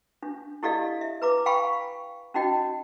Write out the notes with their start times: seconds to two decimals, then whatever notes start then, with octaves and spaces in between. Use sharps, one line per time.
0.23 D4
0.63 E4 G4 A4 D5 D#5 F5
1.01 E5
1.22 B4 A#5 D6
1.46 F5 G5 G#5 B5 C#6
2.34 C#4 D#4 F#4 D#5 G5